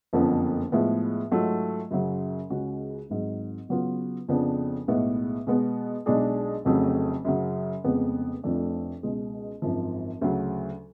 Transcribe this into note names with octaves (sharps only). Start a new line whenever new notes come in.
F#1 F2 D3 F3 B3
A2 F3 G#3 B3
G#2 F#3 A3 F4
F#2 C#3 F#3
C#2 C#3 G#3 C#4 F#4
G#1 G#2 F#3
C#3 F#3 B3 F4
F2 C#3 F3 B3 D4
B1 A2 G#3 B3
B2 G#3 B3
B1 B2 G#3 D4 G#4
F1 F2 C#3 F#3 A3
F#2 C#3 F#3
F1 F2 C#3 G#3 B3
F1 F2 F3 A3 D4
C#2 B2 G#3
G#1 F#2 F3
D2 C#3 F#3